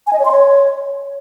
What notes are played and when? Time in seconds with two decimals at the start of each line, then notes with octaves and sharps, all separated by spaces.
0.07 G#5
0.13 D#5
0.19 C#5
0.25 C6
0.31 C#5